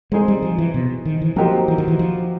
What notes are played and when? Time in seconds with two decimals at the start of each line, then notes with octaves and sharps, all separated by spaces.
0.12 G#3 C4 D#4 G#4 C5
0.28 G3
0.43 F3
0.58 E3
0.74 B2
1.05 D#3
1.21 E3
1.36 F3 F#3 A#3 D#4 G4 C5
1.68 E3
1.78 D#3
1.88 E3
1.99 F3